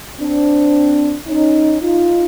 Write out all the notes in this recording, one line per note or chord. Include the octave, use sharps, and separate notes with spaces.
C4 D4
C#4 D#4
D#4 F4